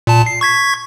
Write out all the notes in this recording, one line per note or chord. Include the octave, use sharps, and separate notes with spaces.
A#2 A5
C7
C#6 G#6 B6